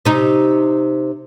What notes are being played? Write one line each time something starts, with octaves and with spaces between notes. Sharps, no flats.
C3 D#4